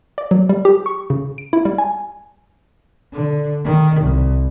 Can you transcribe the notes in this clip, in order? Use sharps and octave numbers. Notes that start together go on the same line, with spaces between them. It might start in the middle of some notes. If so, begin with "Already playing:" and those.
D5
F#3
G3
G4
C#6
C#3
D7
E4
G3
G#5
D3
D#3
C2